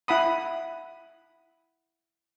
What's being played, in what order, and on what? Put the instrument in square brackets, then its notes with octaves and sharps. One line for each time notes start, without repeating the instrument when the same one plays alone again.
[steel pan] E4 F#5 B5 D#6